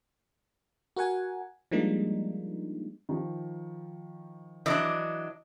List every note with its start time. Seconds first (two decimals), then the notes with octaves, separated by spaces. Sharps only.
0.96 F#4 A#4 F#5 G#5
1.71 F3 G3 G#3 A#3 D4 D#4
3.09 D#3 F3
4.66 E3 F#3 D4 D#5 D6